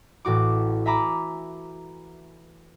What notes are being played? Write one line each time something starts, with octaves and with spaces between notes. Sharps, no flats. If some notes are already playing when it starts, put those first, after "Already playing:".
A1 A2 F#4 D6
E5 G#5 A#5 B5 D6